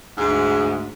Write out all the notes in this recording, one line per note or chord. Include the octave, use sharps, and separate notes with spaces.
D2 G#2